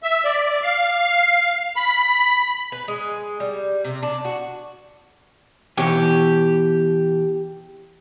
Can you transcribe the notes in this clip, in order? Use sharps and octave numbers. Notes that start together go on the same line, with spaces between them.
E5
D5
F5
B5
B4
G#3
G3
C3
D4
F#4
B2 E3 G4 C#5